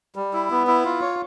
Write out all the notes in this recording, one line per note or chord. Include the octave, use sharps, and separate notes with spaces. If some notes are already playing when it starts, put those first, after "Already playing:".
G3
E4
B3
E4
F4
C#5